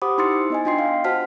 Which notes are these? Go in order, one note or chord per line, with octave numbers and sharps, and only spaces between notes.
G4 C5 F#5 B5 D6 D#6
D#4 E4 C6 E6 A6 C#7
B3 D#5 G#5
D4 F4 D#5 G5 C6 C7
F5
F#4 C5 F#5 A5 F6 B6